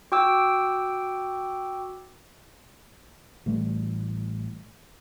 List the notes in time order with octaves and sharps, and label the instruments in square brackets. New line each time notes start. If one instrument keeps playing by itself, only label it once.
[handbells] F#4 G5 D6 E6
[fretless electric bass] A1 E3 G3 A3